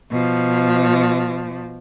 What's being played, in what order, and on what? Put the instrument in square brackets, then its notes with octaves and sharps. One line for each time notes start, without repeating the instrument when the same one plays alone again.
[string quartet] B2 F3